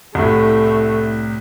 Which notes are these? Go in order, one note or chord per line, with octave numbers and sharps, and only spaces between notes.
C2 A2 A3